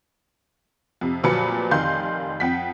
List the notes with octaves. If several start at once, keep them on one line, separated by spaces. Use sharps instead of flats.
F2 C3
F1 A#2 F3 F#3 B4 C#7
F1 D#3 F5 C6 G6
F2 F#5 G5 B6